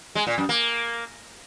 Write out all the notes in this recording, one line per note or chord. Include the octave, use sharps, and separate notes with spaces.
G#3
A#2
F#2
A#3